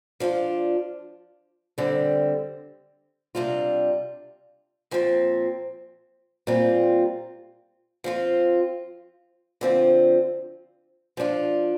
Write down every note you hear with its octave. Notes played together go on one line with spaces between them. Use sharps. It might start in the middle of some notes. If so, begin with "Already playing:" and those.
F3 D4 F4
D3 G3 C4
C3 G3 D4 F4
A#2 F3 C4
A#2 G3 C4 F4
F3 C4 F4
D3 F3 C4 F4
F3 D4 F4